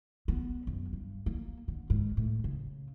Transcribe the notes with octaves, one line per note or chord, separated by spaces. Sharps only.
B3
F#2
G2
A#3
D3
G#2
A2
C#3